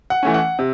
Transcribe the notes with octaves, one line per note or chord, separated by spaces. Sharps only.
F#5
E3 A3 C#4
F#5
C3